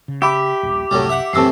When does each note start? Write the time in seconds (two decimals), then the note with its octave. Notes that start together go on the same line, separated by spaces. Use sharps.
0.08 C#3
0.22 G4 E5 B5 D6
0.63 D#1 A#1
0.91 C2 F#2 A2 C3 F#3 G3
1.09 E5 F#5
1.33 F#2 A2 C3 E3 A5 E6 C7